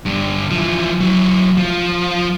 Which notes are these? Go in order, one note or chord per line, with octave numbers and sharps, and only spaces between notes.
G2 D3
E3 F3
F#3 E4
F3